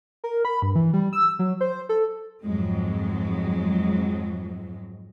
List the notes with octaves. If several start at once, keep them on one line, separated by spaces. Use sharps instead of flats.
A#4
B5
G2
E3
G3
E6
F#3
C5
A4
F2 G#2 F#3 G#3